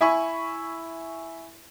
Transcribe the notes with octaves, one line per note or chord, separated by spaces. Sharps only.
E4 E5 G#5 B5 C#6